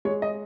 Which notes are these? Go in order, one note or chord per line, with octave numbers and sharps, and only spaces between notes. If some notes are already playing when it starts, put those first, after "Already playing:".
G#3 C#5
D#5